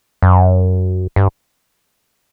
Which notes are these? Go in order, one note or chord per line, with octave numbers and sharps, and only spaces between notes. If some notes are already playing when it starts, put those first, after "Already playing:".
F#2
G2